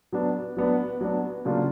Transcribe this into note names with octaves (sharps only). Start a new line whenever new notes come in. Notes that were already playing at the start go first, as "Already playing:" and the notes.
F#3 B3 D4
F#3 B3 D4
F#3 B3 D4
C#3 F#3 A#3 D4 F4